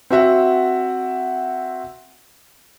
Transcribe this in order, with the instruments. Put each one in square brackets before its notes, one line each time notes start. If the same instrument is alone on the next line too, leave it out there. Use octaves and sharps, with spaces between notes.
[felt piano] C4 F#4 E5 F#5